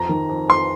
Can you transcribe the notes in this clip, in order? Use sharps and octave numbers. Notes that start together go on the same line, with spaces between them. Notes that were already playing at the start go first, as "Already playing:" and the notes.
Already playing: F2 A#5
D#3
F2
F2 C6